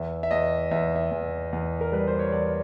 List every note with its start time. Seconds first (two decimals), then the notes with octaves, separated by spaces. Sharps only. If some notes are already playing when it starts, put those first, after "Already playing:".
Already playing: E2 E5
0.23 E5
0.31 E2 D#5
0.71 E2 E5
0.96 E5
1.11 E2
1.53 E2
1.81 A#4
1.92 G3 B4
2.07 C5
2.19 C#5
2.32 E2 D5